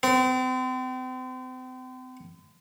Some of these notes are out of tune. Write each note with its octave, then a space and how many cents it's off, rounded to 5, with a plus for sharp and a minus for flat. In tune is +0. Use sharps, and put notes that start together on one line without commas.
C4 -35